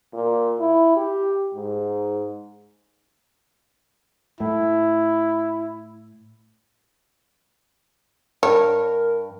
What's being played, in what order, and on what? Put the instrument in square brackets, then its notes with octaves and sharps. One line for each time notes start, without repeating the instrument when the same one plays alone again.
[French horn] A#2
E4
G4
G#2
[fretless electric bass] A2 [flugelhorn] E4
[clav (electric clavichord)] G2 [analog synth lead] A#4 [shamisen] C#5